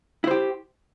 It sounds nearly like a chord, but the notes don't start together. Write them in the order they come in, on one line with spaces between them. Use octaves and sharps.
E4 C5 G4